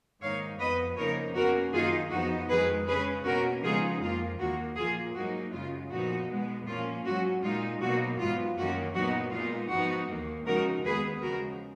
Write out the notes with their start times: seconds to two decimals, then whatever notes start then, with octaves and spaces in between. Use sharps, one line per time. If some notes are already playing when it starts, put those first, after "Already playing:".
0.21 G#2 D#3 A#3 D#4 C#5 F5
0.59 F2 F3 B3 B4 D#5
0.97 F2 C#3 F3 A#3 D#4 A#4 C#5
1.34 B2 A#3 C#4 F#4 A#4
1.73 F#2 D#3 A#3 D#4 F4 G#4
2.10 F2 F3 B3 D#4 F#4
2.48 F2 D#3 G#3 G#4 B4
2.86 C#3 G#3 C#4 G#4 B4
3.25 B2 A#3 C#4 F#4 A#4
3.63 C#3 F3 G#3 B3 D#4 F4 G#4
4.01 F2 F3 A#3 F4
4.38 D#2 D#3 A#3 F#4
4.77 A#2 F3 A#3 F4 G#4
5.14 G#2 F#3 A#3 D#4 F#4
5.52 F#2 C#3 G#3 F4
5.91 A#2 F3 B3 D#4 F#4
6.28 B2 G#3 B3
6.66 A#2 F3 A#3 C#4 F4
7.05 G#2 F#3 C#4 F#4
7.42 A#2 G#3 D#4 F4
7.80 B2 F#3 A#3 D#4 F#4
8.18 G#2 F#3 B3 F4
8.57 F#2 D#3 A#3 C#4 F#4
8.94 A#2 F#3 B3 D#4 F#4
9.32 A#2 G#3 B3 D#4 F4
9.70 G#2 F3 B3 D#4 F#4
10.08 D#2 D#3 A#3
10.46 C#3 F3 G#3 D#4 F#4 A#4
10.84 D#2 D#3 G#3 B3 G#4 B4
11.22 C#3 F3 G#3 F#4 A#4